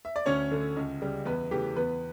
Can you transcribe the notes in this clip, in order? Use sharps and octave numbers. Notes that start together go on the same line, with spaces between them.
E5
D5
D2 C#4 C#5
D3 A3
C#2
C#3 G3
E2 B3 B4
C#3 E3 A3 G4
E2 B3 B4